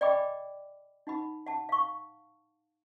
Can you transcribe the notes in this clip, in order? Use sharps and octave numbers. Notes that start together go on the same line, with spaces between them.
D5 D#5 G5 G#5 B5 D6
D#4 F#5 B5
F#5 A5
F5 C#6